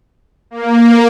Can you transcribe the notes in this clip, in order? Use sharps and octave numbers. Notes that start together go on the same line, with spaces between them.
A#3